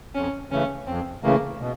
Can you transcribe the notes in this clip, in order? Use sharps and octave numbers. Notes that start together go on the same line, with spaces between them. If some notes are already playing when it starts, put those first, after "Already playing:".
F2 C#4
C#3 E3 A3 C#4
F2 C4
C#3 E3 A3 A#3
B2